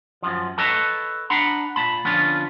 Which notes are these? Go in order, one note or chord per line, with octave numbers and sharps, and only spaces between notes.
F#2 F3
A4 B4 C#5 D#5 A5
D4 F#5 A#5 B5
A#2 A5 B5
D3 F3 B3 C#4 F4